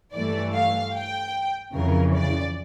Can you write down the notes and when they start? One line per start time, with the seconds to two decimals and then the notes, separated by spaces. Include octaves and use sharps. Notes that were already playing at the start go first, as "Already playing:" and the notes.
0.13 G2 E3 A3 D5
0.53 F5
0.93 G5
1.73 F2 C#3 E3 A#4
2.14 D5